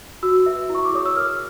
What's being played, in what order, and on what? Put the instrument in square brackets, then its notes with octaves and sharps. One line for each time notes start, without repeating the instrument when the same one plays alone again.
[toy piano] F#4 [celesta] E6
[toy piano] B4 E5
[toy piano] E4 [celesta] C#6
[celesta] D6
[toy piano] G#4 C#5 [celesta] D#6
[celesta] E6
[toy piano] A#4 [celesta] F6